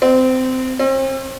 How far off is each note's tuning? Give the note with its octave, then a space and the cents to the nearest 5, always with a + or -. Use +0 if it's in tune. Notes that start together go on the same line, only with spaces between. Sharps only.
C4 -20
C4 +40